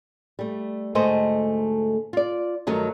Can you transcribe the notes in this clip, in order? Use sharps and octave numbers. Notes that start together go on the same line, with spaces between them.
G3 A3
D2 G#2 A3 A4 C5 D#5
F4 D5
G2 D#3 F#3 A3